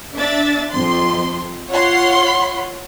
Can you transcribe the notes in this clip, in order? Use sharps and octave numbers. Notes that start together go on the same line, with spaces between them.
D4 E5 A6
F2 C6
F4 C#5 F#5 C6